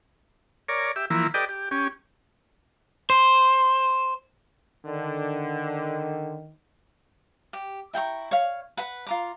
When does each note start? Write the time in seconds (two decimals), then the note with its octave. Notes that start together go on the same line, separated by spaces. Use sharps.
0.69 A#4 C#5 D5
0.96 G4 E5
1.10 E3 F3 A#3 E4
1.34 G4 A4 B4 D5 D#5 G5
1.49 G4
1.71 C#4 G4
3.10 C5
4.85 D3 D#3
7.53 G4
7.93 E4 G5 A#5 C#6
8.31 C#5 F5
8.77 B4 F#5 B5
9.07 F4 A#5 D6